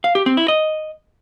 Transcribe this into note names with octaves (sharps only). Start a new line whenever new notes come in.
F5
G4
C4
E4
D#5